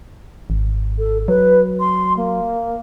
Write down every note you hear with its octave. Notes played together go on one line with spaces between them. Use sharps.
G#1
A4
F#3 B4
C6
A#3